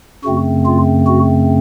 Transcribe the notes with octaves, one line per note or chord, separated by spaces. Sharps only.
F#2 C#3 A3 C4 F#4
F4
F#4